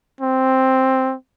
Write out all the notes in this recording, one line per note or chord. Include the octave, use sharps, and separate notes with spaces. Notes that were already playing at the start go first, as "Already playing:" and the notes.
C4